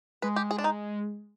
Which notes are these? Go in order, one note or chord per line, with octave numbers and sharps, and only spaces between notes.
G#3 B4
G4
G#4
D4
D#4